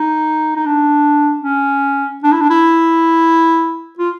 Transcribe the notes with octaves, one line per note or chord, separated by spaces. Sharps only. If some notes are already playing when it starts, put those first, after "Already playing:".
Already playing: D#4
D#4
D4
C#4
D4
E4
D4
E4
F4